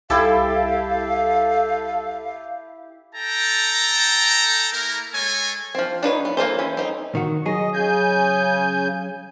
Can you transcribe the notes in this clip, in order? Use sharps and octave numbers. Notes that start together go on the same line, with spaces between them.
C2 E4 G4 A4 F5 A5
A4 G5 A5 A#5
A#3 E4 A#4
G#3 A4 C#5 G#5
F3 C4
D4 D#4 B4 C#5
B3
A#3 F4 A4 C5
E3 C#4
C4 D#4
D#3 F#4
F#3 G#4 D#5
C#3 G#5 G6